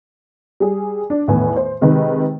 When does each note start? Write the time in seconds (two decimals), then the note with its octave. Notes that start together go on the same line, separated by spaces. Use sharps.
0.60 G3 G#4
1.10 D4
1.28 E2 A2 D#3 B4 G#5
1.56 C5
1.81 C3 D#3 G#3 D#4 B4